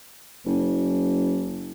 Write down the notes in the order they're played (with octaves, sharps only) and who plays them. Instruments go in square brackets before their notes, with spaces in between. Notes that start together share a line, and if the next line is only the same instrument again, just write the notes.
[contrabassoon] F#1